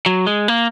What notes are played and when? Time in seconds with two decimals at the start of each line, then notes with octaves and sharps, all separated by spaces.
0.06 F#3
0.27 G#3
0.48 A#3